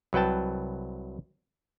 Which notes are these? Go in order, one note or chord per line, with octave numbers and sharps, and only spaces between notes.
C2 F#3 B4 G5 A5